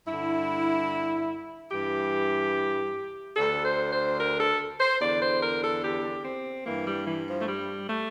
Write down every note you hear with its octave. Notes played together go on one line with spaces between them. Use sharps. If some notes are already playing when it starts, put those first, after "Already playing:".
G2 D3 E4
G2 E3 G4
D2 D3 A4
C5
C5
A#4
A4
C5
E2 D3 D5
C5
A#4
A4
G4
C4
G2 E3 A#3
G3
E3
F3
A3
G3
A3